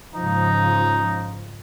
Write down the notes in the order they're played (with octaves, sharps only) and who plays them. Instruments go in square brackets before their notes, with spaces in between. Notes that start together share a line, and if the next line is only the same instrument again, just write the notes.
[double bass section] G#2 C#3 F3 [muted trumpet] D#4